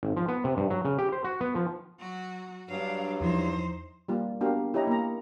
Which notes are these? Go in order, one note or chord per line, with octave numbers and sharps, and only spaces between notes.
G#1
F3
B3
C3
G2
F#3
C#3
G4
C5
F#4
B3
F3
F#3 F#4
G2 F#3 D4 F5
E2 F3 D#4 E4 C5
G3 A#3 F4
B3 D4 F#4 G4 A#4 F5
E4 G4 C#5 D#5 A#5
A#3 A#5